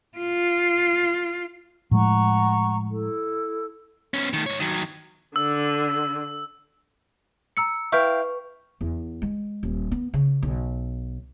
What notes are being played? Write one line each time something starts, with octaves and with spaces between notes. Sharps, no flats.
F4
A2 F3 G#3 F#5 A#5 C#6
E4 A4
B3 C#4
D#3 A3
G#2 C#5
D#3 F#3
D3 E6
A#5 E6 C#7
E4 B4 F5 G5 C#6
E2
G#3
D#1
B3
C#3
B1